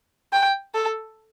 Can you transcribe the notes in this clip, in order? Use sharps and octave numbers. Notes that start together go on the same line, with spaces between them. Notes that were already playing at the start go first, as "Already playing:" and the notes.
G5
A4